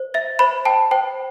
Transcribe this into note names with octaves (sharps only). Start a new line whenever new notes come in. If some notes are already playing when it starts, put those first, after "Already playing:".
Already playing: C5
E5 A6
C5 B5
G5 A5
C5 G5